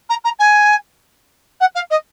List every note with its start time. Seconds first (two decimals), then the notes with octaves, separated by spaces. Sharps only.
0.09 A#5
0.24 A#5
0.39 G#5
1.60 F#5
1.75 F5
1.90 D#5